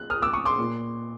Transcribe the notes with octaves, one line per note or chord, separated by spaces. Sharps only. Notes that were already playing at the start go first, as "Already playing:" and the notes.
Already playing: F#6
D#6 F6
D6 E6
C#6 D#6
C6 D6
A#2